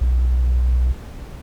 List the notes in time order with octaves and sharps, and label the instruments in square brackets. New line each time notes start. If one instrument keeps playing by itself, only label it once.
[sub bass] B1